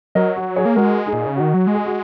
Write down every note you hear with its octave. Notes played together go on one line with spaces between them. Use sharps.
F#3 A#4 D#5
F#4
G#4 C#5
A#3
G#3 F#4 A#4
D#4 G#4
A#2
C#3
D#3 F#4
F#3
G#3
G#4
F#4